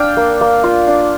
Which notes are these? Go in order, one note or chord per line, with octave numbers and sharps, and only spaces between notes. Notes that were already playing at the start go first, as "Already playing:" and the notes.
Already playing: D4 F5 G5
A#3
A#3
F4
D4